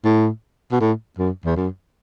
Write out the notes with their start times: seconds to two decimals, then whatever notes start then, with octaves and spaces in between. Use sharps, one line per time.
0.05 A2
0.72 B2
0.81 A2
1.18 F#2
1.45 E2
1.56 F#2